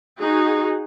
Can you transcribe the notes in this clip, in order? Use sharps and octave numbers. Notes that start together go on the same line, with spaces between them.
D#4 F#4 G#4